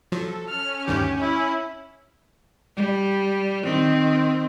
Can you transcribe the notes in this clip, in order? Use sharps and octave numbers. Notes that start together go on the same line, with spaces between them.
F3 F#3 A4
C#4 F6
D2 G2 D#3 G4
E4
G3
D#3 C4